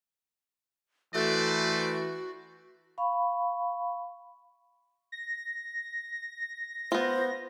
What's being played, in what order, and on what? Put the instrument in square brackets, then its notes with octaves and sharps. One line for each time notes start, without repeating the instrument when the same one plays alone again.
[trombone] E3 [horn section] A3 [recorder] F#4 [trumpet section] B4 C5 D5
[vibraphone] F5 B5 C#6
[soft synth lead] A#6
[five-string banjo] B3 F4 [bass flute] C5